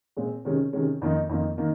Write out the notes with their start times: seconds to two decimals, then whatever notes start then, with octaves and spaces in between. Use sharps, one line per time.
0.17 A#2 G#3 C4
0.45 C3 D#3 G#3 C#4
0.73 C3 D#3 G#3 C#4
1.01 F2 D#3 A#3 D#4
1.29 F2 D#3 A#3 D#4
1.58 D#3 A#3 D#4